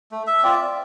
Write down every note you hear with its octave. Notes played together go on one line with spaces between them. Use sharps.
A3
E5
C4 F4 D5